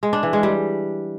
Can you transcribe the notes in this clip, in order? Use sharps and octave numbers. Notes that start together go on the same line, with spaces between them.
G#3
D4
E3
G#3
G3